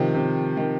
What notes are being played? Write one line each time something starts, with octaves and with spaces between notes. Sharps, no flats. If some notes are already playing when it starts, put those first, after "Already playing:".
Already playing: C3 D#3 F3
C3
D#3